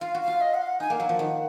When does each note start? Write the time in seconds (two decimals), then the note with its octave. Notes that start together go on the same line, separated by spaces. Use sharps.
0.01 F4 F5
0.14 F#4
0.21 F5
0.27 F4
0.41 D#5
0.54 F#5
0.61 F5
0.67 F#5
0.80 D#4 G#5
0.90 A#3 F5
1.00 F#3 F#5
1.09 F3
1.19 D#3